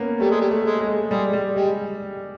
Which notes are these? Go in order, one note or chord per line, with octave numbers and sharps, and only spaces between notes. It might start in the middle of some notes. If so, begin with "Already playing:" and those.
Already playing: A#3 B3 C#4
G3 A3
G#3
G3
A3
G#3
G#3
G3 G#3
G3
G3 G#3